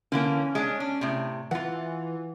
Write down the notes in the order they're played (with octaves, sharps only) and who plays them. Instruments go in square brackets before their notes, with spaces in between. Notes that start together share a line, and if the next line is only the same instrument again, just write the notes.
[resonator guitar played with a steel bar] D3 E3 A#3 [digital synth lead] C#4
[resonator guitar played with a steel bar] G#3 D4
D4
A2 C3
[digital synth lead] E3 [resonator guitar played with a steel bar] F4 F#5